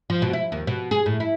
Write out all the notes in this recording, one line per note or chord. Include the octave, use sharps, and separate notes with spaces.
F3
B2
E4
D#2
B2
G#4
A2
E4